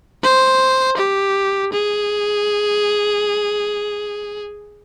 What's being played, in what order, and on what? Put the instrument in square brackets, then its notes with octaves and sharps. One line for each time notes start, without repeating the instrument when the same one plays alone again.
[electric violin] C5
G4
G#4